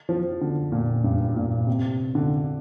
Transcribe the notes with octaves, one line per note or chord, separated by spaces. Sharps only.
F3
D3
A#2
G2
A#2
C3
D3